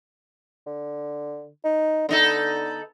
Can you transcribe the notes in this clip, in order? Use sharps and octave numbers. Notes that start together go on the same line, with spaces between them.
D3
D#4
D3 B3 D#4 A4